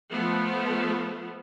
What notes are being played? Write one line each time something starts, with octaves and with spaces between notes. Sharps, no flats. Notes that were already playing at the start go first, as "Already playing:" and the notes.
F3 A3 B3